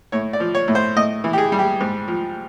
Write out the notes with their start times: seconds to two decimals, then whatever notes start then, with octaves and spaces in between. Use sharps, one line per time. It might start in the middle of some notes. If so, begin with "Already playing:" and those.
0.12 A2 C#5
0.33 D5
0.40 F3
0.55 C#5
0.68 A2
0.75 C5
0.96 A2 D#5
1.24 E3
1.33 G4
1.38 G#4
1.52 G3
1.59 G4
1.81 G#2
2.08 F3